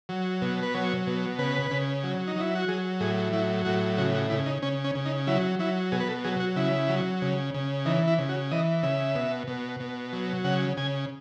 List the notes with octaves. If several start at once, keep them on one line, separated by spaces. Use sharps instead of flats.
F#3
B2
B4
F#3 C#5
B2
C#3 B4
C#3
F#3
D#4
F#3 E4
F#4
F#3 G#4
A2 G#4
F#3 E4
A2 F#4
C#3 F#4
F#4
C#3 E4
D#4
C#3 C#4
C#4
C#3
D#4
F#3 E4
F#3 E4
B2 G#4
B4
A4
F#3 G#4
F#4
C#3 E4
F#3
C#3
C#3
E3 D#4
E4
C#3
F#4
E3 D#5
C#3 E5
B2
B2
B2
F#3
C#3 F#5
C#3 G#5